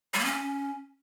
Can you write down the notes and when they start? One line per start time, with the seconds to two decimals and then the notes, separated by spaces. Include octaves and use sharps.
0.14 G3
0.19 A#3
0.25 C#4